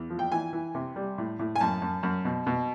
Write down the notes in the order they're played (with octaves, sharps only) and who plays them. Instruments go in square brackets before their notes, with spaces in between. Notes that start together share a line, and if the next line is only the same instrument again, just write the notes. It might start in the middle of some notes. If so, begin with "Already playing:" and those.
Already playing: [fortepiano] E2
F3
G5
E3 G#5
E3
C3
G3
A2
A2
G#5
F#2 A5
F#2
F#2
B2
B2